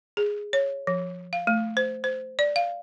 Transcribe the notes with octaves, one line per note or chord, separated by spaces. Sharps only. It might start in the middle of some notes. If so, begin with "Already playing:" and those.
G#4
C#5
F3
F5
A3
C5
C5
D5
F5